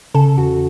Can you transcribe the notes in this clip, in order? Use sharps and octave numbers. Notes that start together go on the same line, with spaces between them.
C#3 A4
E2 F#4